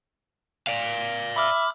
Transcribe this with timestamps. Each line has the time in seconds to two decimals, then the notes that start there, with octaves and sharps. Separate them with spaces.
0.67 D5 F5
1.36 E5 B5 D6 F6